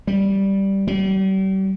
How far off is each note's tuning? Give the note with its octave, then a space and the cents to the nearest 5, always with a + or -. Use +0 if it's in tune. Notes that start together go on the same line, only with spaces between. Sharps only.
G3 -5
G3 -40